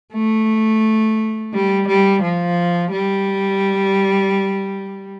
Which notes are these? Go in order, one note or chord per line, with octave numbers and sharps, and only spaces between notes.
A3
G3
G3
F3
G3